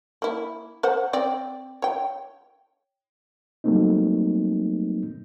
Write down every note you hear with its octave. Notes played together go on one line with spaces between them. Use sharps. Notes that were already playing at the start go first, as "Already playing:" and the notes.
A#3 E4
A#4 C5 F#5
C4 D5 G5
C#5 G5
F#3 G3 A3 A#3 C4 D#4